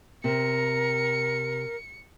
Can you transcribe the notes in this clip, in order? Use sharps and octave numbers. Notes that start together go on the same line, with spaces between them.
C3 A#4 C#7